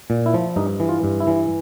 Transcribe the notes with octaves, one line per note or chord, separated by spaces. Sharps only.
A#2
E4
F3
G2 D#4
E3
F4
G2
E4
E3